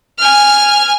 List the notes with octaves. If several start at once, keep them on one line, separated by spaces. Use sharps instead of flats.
G#5 F6